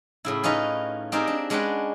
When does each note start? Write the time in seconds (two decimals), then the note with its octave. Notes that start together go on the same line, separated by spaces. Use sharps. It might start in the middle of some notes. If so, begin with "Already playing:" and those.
0.25 A2 C#3 E4
0.44 C#4 D#4 F4 B4 D#5
1.12 C4 D#4 G4 G#4 A#4 D5
1.27 D4
1.50 G#3 C#4 D4 B4 F#5 G5